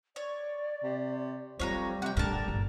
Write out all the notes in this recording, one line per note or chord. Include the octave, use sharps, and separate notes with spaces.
C#5 D5
C3
F2 F#3 G3 A3 C#5 F5 A#5
C3 F#5 G5
A2 D3 A#4 A5
G1